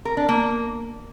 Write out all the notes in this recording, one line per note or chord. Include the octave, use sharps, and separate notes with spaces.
A#4
D4
A#3